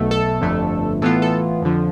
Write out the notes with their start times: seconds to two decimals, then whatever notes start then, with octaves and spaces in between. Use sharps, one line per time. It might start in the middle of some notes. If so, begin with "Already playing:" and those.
Already playing: B1 B2 A3
0.11 A4
0.41 G1 F2 D3 A3
1.02 A2 E3 B3 F4 A4
1.22 A4
1.62 F2 D3 F3